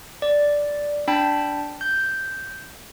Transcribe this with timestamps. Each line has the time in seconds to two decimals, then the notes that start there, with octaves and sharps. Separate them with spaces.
0.22 D5
1.08 D4 G5 A5 B5
1.81 G6